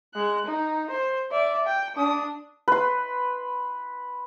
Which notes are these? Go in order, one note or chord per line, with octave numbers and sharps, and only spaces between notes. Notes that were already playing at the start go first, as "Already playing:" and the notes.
G#3 F#6
D#4
C5
D5 E5
G5
D4 D#6
B4 C6